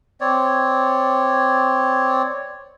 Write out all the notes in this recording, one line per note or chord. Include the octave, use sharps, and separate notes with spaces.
C4 C#5 D5